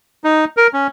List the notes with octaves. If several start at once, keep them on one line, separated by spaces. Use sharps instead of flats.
D#4
A#4
C#4